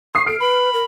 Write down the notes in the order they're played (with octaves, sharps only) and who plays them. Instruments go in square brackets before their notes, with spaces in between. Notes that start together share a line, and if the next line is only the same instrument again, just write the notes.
[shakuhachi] C#6 [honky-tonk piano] D#6 C7
[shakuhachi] A4 [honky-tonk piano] F6 D7
[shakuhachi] B4 [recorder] B5
[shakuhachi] A#4